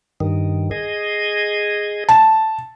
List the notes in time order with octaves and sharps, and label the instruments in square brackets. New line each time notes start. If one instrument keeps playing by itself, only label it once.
[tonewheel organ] G2 D#3
G#4 D#5
[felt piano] A5